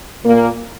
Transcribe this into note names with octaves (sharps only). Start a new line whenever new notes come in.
A#2 A#3